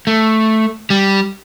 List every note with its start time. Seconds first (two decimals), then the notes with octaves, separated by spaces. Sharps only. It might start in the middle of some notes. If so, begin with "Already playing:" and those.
0.07 A3
0.90 G3